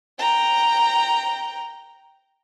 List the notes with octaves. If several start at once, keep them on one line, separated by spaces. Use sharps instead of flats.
G5 A#5